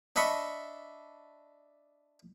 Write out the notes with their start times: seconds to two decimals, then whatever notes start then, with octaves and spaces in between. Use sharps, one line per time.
0.16 D4 D#5 E5 B5 C#6